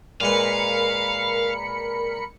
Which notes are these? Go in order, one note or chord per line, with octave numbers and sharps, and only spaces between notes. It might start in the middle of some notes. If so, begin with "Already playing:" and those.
A#2 G#3 A#4 B4 F5 B5 C#7